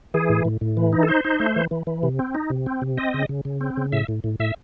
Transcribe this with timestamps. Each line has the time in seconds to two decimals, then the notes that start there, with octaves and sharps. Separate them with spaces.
0.14 E3 G#4
0.29 A2
0.45 A2
0.61 A2
0.77 E3
0.93 D#4
1.03 A4
1.08 D#4 C5
1.25 D#4
1.40 A3
1.56 E3
1.71 E3
1.87 E3
2.03 C3
2.19 C4
2.35 D#4
2.50 C3
2.66 C4
2.82 C3
2.97 C4 D#5
3.14 C#3
3.29 C#3
3.45 C#3
3.61 C4
3.77 C#3
3.92 A2 E5
4.08 A2
4.24 A2
4.40 A2 E5